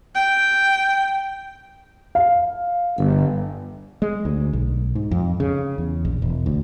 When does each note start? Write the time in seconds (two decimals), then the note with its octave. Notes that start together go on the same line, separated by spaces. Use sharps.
0.15 G5
2.15 F5
2.97 G1
4.02 G#3
4.25 D2
4.53 B1
4.95 G#2
5.11 F2
5.40 C#3
5.78 E2
6.05 A#1
6.22 E1
6.46 D2